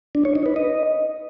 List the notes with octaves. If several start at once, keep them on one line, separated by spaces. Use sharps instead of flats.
D4
C#5
D#4
B4
D#5